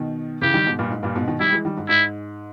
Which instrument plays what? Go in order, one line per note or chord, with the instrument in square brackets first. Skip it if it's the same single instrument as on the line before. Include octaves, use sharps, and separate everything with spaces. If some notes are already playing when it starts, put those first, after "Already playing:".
Already playing: [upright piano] B2 D#3
[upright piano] C#3 E3 [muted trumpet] G4
[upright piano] D#3 G3
G#2 B2
G2 A#2
G#2
G2 A#2
G#2 B2
B2 D#3
[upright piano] D#3 G3 [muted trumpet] E4
[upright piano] E3 G#3
D#3 G3
G#2
[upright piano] G#2 [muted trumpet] E4